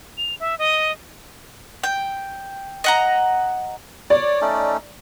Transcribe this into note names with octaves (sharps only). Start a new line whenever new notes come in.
F7
E5
D#5
G5
D#5 F#5 A#5
C#5 D5
A3 C#4 D#4